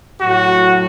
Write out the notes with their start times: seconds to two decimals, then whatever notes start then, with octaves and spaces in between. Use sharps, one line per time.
0.20 A2 F#3 F#4